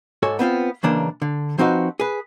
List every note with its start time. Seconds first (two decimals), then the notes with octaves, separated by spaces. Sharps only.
0.23 G#2 F#4 A4 C#5 G#5
0.39 B3 C4 D4 F4
0.83 B1 C#3 E3 A#3 D4 C5
1.22 D3
1.58 F3 C4 D#4 F#4 B4
2.00 G#4 B4